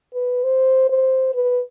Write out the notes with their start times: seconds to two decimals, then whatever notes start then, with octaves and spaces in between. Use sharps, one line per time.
0.14 B4
0.44 C5
0.89 C5
1.34 B4